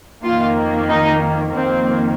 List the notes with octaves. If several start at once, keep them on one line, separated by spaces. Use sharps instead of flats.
F2 D#3 A#3 F4
D#4
F2 D#3 A#3 C4